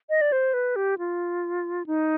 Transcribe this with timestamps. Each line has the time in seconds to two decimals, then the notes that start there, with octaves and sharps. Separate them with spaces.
0.10 D#5
0.21 D5
0.32 C5
0.54 B4
0.76 G4
0.98 F4
1.86 D#4